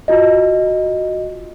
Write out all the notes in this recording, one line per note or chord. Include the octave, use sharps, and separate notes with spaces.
F4 F#4 D#5